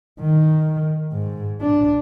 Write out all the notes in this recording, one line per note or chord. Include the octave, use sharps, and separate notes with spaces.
D#3
G#2
D4